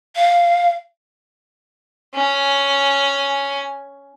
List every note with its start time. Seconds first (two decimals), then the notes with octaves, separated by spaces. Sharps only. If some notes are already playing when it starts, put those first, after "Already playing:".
0.15 F5
2.14 C#4 G#5